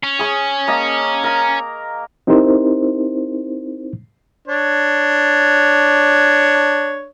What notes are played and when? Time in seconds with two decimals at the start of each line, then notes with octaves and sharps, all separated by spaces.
0.04 C#4
0.19 G#4 C#6
0.68 A#3 D#5 A5
1.24 A#4 A#5
2.27 C4 D#4 E4 G4 A#4 C5
4.48 D4 C#5